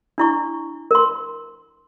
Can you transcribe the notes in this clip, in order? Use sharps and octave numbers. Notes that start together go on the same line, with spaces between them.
D4 E4 C#6
A#4 C6